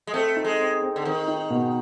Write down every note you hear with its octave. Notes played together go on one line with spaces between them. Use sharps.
G#3
A3 C4
D#4
G#3
C4
C4
D3
D#3 C4
D#4
B2